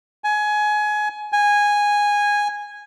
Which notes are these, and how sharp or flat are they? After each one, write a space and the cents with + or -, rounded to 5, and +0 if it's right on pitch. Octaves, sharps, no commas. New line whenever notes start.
G#5 +20
G#5 -10